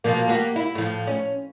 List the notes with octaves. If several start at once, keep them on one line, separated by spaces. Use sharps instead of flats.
B2 F3 A#3
A#3 F#4 G4
E4
A2 F3
C#4